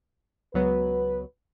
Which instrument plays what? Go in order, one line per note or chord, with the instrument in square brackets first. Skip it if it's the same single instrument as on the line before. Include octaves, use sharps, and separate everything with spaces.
[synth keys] C#2 F#3 B3 [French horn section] B4